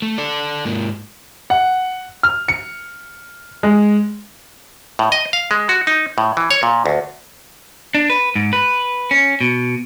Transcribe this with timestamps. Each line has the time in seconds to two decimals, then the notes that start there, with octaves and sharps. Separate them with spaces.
0.02 A3
0.18 A4 D5
0.65 G#2 A#3
1.50 F#5
2.23 F6
2.48 C#7
3.63 G#3
4.99 A2
5.12 D#5
5.33 F5
5.51 G#3
5.69 F#4
5.87 D#4
6.18 A2
6.37 E3
6.51 C#5
6.63 A#2
6.86 D2
7.95 D4
8.10 B4
8.35 G#2
8.53 B4
9.11 C#4
9.41 B2